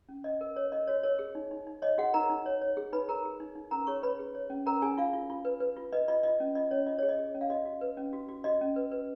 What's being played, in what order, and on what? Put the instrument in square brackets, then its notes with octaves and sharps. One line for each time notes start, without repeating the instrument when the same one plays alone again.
[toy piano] C#4
C#4 D#5
A#4
A#4 C#5
A#4 D#5
F#4 C#5
A#4 C#5
G#4
D#4
D#4
D#4
C#5 D#5
F#4 G#4 F#5
D#4 A#4 A#5
D#4
C#5
C#5
G#4
D#4 B4 B5
G#4 A#4 A#5
G#4
D#4
D#4
C#4 A#4 A#5
G#4 C#5 C#6
B4 C#5 B5
G#4
C#5
C#4
C#4 A#4 A#5
C#4 G#4 G#5
F4 F5
F4
F4
B4
B4
F4
B4 D#5
F4 D#5
F4 D#5
C#4
F4 D#5
C#4 C#5
F4 D#5
G#4 C#5
D#5
G#4
C#4
F5
F#4 D#5
F#4
B4
C#4
F#4
F#4
F#4 D#5
C#4
B4
B4